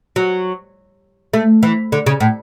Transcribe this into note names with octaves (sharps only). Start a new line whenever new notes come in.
F#3
A3
E3
D3
C#3
A2